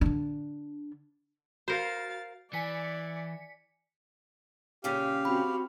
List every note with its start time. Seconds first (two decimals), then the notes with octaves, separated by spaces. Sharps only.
0.01 D3 D4
1.68 F#4 A#4 C5 F5 A6 C#7
2.53 E3 D5 G#5 B6 C#7
4.84 A#2 C#3 C#4 G4 F5
5.25 C4 F#4 B5